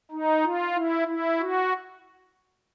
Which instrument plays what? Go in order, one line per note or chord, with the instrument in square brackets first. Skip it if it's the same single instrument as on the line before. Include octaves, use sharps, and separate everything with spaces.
[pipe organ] D#4
F4
E4
E4
F#4